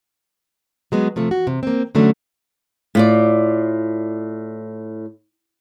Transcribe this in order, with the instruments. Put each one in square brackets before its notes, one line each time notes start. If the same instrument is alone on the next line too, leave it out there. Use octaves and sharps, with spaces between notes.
[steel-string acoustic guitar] F#3 G#3 B3
C3 F3 A3
F#4
C3
A#3 C4
D3 F#3 A3 C#4
[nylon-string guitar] A2 F4 D5